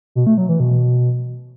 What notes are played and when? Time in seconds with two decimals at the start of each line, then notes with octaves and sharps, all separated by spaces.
0.15 B2
0.27 A3
0.38 F#3
0.49 E3
0.60 B2